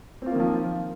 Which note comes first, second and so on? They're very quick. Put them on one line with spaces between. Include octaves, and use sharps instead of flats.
C4 F4 A#3 D#3 F3